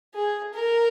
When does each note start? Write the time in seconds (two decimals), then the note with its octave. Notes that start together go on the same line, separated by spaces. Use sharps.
0.14 G#4
0.53 A#4